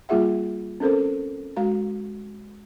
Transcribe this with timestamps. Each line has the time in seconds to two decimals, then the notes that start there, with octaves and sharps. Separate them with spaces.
0.09 G3 A#3 F4 G#4 E5 F#5
0.80 C4 C#4 A4 A#4 C5
1.57 G#3 F#4 F5 A#5